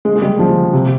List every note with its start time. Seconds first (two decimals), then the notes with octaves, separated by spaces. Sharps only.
0.05 G#3
0.16 G#3
0.22 G3
0.39 F3
0.73 C3